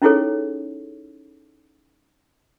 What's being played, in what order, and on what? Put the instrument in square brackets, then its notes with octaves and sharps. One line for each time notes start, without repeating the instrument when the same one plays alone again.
[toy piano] C#4 D#4 E4 G#4 A4 C#5